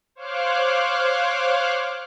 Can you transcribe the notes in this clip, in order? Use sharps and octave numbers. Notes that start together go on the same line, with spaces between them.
C5 C#5 F5 D6 F6 F#6